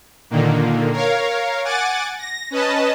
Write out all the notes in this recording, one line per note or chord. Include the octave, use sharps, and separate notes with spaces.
A#2 D3 D#3 A#3
A#4 C#5 F5
F#5 G#5 D6 A6
A#6
C#4 B4 D#5 A5